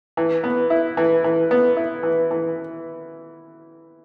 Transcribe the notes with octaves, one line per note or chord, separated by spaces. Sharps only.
E3
B3
E4
E3
E3
B3
E4
E3
E3